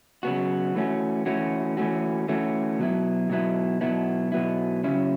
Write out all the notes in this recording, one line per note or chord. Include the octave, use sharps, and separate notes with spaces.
C#3 F#3 B3 F#4
E3 A3 C#4 F#4
E3 A3 C#4 F#4
E3 A3 C#4 F#4
E3 A3 C#4 F#4
B2 F#3 B3 E4
B2 F#3 B3 E4
B2 F#3 B3 E4
B2 F#3 B3 E4
C#3 F#3 C#4 E4